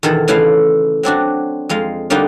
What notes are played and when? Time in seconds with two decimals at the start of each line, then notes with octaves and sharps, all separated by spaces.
0.03 E2 B2 D#3 E4 A4
0.28 C#3 E3 A3 E4 E5 F5
1.03 F#3 C4 D4 F#4
1.69 F2 G#3 F4 F5
2.10 D3 G3 A#3 D#4 F4 F#4